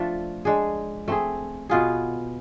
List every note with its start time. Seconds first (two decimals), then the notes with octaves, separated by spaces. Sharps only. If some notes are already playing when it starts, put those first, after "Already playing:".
Already playing: F3 A3 D4 A4
0.45 G#3 D4 G#4
1.08 A3 C4 G#4
1.69 B2 B3 F4 G#4